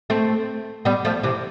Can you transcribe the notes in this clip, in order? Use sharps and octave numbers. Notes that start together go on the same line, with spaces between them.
A3 C4
G3 B3
F3 A3
C3 E3